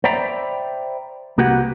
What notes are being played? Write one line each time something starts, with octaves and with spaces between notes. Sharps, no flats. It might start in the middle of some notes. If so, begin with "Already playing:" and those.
C5 D5 E5 G5 A#5 B5
C2 A#3 F#4 G4 B4 F#5